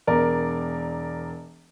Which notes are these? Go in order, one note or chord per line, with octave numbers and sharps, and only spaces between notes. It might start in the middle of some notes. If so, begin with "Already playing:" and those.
E1 A#4 D5